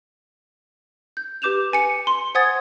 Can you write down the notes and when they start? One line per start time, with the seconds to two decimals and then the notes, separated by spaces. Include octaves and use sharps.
1.17 G6
1.42 G4 B4 D6 G6 E7 F7
1.72 B4 G#5 C#7
2.07 C6
2.35 C5 F#5 G#5 D#6 G#6 A6